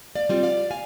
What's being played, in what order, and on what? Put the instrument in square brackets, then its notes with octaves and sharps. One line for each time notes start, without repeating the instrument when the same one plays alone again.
[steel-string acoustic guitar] D5 F5
G3 C4 F4
D5 F5
F5 G#5